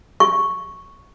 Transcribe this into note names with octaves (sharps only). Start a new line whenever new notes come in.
C#6